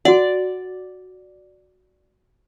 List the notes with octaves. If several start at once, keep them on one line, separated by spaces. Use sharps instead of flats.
F#4 D5 F#5